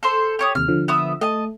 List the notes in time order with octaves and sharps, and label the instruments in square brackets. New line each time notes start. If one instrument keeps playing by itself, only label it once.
[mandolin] A4 C5 C6
G4 C#5 D#6
[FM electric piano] D#2 C3 [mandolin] F6
[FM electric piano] D3 F3
[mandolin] B3 E5 D#6
[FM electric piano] A3 [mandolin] D#5 A5